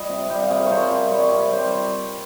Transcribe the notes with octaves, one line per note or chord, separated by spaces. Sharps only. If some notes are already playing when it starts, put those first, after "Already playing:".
Already playing: G3 D#5
C3
G3 G5
F5
C3 G#4
A#4
G3 C5 C#5
C3
G3 C#5
C3
G3 C5